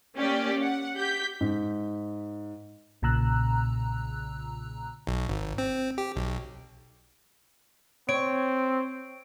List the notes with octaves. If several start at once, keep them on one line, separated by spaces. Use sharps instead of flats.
A#3 C#4 G4 D5
F#5
G4 G6 B6
G#2
B1 A#2 C#3 A#5 E6 F#6
B1
G#1
C4
G4
B1
C4 C#5 D7